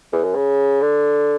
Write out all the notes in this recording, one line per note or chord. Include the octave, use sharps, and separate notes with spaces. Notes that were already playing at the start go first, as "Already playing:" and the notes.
E2
F#2
C#3
D3